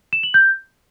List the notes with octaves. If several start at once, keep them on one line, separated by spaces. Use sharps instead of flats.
E7
F#7
G6